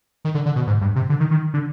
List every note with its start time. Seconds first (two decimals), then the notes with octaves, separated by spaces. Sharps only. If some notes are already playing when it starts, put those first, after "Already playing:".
0.25 D#3
0.35 D3
0.46 D3
0.56 B2
0.67 G#2
0.81 G2
0.96 C3
1.09 D3
1.20 D#3
1.31 D#3
1.54 D3